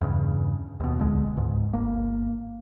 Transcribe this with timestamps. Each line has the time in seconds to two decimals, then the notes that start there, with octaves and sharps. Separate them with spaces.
0.01 E2 G2 C#3
0.80 D#2 B2
0.99 D1 C2 D3 G#3
1.37 C#2 G#2
1.73 G1 A#3